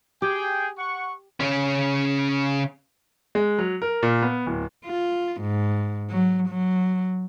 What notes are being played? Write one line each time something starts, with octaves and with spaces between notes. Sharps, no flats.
G4 G#4 G5
F#5 C#6
C#3 C#4
G#3
F#3
A#4
A#2
B3
D1
F4
G#2
F#3
F#3